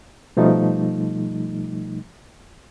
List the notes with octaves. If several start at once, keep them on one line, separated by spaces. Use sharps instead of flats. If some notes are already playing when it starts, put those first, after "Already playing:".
B2 F3 G3 A3 D#4